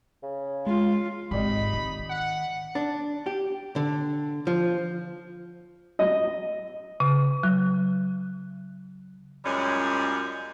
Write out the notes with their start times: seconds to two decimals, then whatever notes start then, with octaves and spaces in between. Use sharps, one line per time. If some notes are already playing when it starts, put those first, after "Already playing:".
0.23 C#3
0.67 G#3 F4
1.31 G#1 G#2 D#4 G4 D5 D#5 B5
1.73 D#3
2.10 F#5
2.75 D4
3.26 G4
3.76 D3
4.47 F3
5.99 D#5
7.00 C#3
7.43 F#3
9.45 F#2 A#2 G3 G#3 C#4